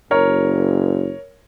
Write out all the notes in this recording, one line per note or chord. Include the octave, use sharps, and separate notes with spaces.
F#1 A#4 C#5